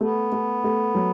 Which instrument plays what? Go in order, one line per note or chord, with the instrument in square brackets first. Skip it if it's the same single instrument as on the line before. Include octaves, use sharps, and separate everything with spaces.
[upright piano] A3 [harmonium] B3
[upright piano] A3
A3
F#3